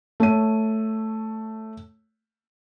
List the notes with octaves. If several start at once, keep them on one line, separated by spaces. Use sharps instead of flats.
A3 C#5 D#7